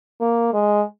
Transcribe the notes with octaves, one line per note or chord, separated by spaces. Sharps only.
A#3
G#3